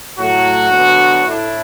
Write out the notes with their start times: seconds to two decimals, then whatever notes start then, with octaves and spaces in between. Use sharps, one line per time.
0.18 A2 F#3 A3 F#4
0.72 D2 D3 F#3 B3 D4
1.26 A2 A3 D4 E4